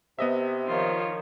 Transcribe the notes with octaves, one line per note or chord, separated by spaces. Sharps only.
C3 B3 D#5 E5
D#3 F3 F4 C#5